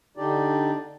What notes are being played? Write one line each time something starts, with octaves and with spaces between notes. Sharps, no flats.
D3 D4 D#4 G4 D5